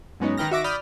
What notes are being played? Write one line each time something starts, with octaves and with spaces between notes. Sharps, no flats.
G#2 F#3 G#3 B3 C#4 D#4
D#3 D#4 B4 G5 F6 A#6
D#3 F#4 E5 D6 A#6
D5 B5 D#6 F6 G6